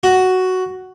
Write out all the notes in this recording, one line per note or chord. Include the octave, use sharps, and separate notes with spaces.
F#4